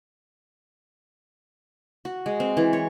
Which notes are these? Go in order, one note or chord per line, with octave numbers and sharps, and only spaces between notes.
F#4
G#3
C4
E3
C#5